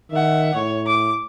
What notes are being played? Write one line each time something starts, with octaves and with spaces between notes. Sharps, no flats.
D#3 E5 F#5
A2 C#5
D6